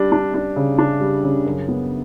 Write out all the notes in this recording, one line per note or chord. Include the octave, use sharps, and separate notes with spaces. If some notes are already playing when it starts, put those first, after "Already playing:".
Already playing: G3 D4
D4
D4
C#3
D4
G3
C#3
F#2
B3